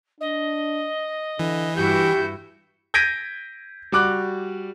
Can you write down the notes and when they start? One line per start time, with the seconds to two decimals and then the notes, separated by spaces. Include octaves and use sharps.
0.20 D4 D#5
1.39 D3 E3
1.76 G2 E4 F#4 G4 G6
2.94 G6 G#6 A#6 B6 D7 D#7
3.92 G3 F#4 D6 F#6